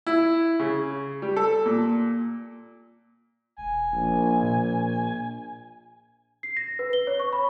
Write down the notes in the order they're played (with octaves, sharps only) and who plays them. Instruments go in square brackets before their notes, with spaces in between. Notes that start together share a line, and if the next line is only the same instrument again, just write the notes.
[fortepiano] E4
C#3
G3
A4
A#2
[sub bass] E1 [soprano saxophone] G#5
[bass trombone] A#1
[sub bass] A#2
[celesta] C7
A#6
B4
G7
C#5
C#6
B5